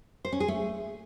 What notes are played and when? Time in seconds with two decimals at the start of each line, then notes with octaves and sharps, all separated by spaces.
0.25 C5
0.32 C#4
0.40 G#4
0.48 A3